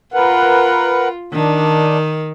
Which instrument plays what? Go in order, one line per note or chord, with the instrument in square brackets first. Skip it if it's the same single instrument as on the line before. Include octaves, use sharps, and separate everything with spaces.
[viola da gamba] F4 [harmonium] A#4 B4 F#5
[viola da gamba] D#3 [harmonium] D4